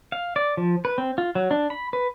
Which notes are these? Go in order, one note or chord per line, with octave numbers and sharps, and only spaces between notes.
F5
D5
F3
B4
C4
F4
F#3
D4
B5
B4